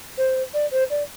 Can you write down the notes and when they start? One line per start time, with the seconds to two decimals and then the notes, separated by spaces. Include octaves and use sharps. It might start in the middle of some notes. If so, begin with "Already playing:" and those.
0.17 C5
0.53 D5
0.71 C5
0.90 D5